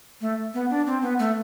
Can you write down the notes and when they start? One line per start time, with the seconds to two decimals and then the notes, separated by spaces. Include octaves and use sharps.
0.21 A3
0.54 B3
0.71 D4
0.87 C4
1.02 B3
1.19 A3